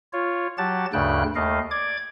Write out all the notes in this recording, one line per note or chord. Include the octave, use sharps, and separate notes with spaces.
F4 C#5
F#3 G4 F#5 A5 A6
D2 G2 C#3 G5 F#6
D#2 A3 D#5 F5
D5 D6 G#6